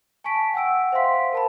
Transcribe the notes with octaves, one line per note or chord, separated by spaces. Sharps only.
G#5 A5 C#6 B6 D7
F#5 G5 E6 D7
C5 E5 F5 C6 B6
A#4 A5 B5